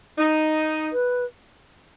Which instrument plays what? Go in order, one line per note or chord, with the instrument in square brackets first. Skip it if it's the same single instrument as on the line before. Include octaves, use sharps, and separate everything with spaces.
[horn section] D#4
[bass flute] B4